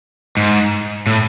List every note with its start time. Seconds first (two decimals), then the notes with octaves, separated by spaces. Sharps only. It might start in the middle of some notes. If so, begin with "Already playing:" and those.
0.37 G#2
1.07 A2